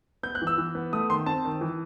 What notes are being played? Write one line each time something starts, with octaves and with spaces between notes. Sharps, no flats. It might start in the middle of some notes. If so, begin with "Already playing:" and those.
B3 G6
F#6
E3
E6
E3
B3
A3 D#6
D#3 C6
C4 A5
D#3
E3